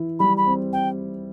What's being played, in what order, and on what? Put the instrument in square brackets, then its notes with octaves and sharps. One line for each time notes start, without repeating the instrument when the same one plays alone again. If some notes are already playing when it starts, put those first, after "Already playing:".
Already playing: [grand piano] E3 E4
[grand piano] G3 [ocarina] B5
[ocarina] B5
[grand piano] C4
[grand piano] C4 [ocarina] G5